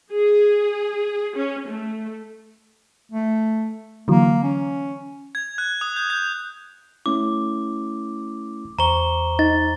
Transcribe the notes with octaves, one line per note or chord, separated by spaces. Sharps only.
G#4
C#4
A3
A3
D3 E3 F#3 A#3
C#4
G#6
F#6
D#6
G6
G6
A3 C#4 E4 D6
E2 C5 A#5 C#6 G7
D#4 A6